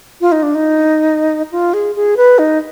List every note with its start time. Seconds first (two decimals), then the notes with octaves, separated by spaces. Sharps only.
0.21 F4
0.32 D#4
0.43 D4
0.55 D#4
1.52 F4
1.74 G#4
1.95 G#4
2.17 B4
2.39 D#4